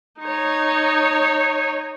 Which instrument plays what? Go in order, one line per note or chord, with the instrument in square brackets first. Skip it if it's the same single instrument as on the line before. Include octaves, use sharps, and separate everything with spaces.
[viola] D#4 C#5